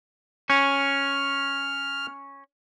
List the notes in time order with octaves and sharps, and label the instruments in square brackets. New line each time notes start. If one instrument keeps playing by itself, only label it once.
[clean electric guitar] C#4 [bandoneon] F6